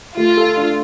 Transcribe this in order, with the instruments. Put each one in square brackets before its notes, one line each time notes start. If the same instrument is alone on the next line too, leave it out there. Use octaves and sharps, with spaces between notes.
[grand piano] A3 [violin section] F4
[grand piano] A4
D4